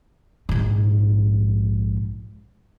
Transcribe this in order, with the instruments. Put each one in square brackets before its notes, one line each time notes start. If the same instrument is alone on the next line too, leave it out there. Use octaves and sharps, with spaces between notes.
[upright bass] A#1 G#2